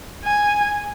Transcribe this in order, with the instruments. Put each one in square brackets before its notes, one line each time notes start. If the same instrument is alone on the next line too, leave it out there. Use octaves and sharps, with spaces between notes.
[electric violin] G#5